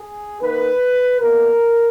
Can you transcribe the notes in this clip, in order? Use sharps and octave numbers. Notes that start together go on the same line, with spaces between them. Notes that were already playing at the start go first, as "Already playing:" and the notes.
Already playing: G#4
D#3 A#3 B4
B2 A#3 A#4